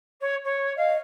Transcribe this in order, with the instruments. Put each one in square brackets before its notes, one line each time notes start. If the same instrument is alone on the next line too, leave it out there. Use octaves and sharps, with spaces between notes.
[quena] C#5
C#5
[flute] D#5 [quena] F5